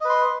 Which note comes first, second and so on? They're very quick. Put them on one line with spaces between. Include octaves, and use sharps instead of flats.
D#5 B4 C6